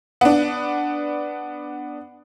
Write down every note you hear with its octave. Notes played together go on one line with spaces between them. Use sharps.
B3 D4